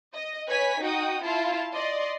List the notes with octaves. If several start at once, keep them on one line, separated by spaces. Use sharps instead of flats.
D#5
B4 C#5 G#5 B6
D#4 F#4 G5 D#6
E4 F4 F5 A5
D5 D#5 C6